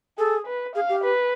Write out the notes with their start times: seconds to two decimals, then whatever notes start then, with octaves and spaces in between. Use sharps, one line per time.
0.18 G#4 A4
0.47 B4
0.75 G#4 F5
0.89 G4
1.04 B4